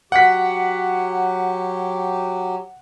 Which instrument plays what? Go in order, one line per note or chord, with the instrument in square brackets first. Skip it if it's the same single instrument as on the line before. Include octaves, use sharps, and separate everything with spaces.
[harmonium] F#3 G4 [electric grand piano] F#5 F#6 B6